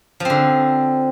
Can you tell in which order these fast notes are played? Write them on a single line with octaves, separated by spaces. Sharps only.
F3 C4 D3